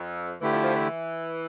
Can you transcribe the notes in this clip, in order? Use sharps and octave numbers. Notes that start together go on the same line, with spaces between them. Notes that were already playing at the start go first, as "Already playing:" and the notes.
Already playing: F2
D3 E3 A3 E4 G4
F3
F3
E3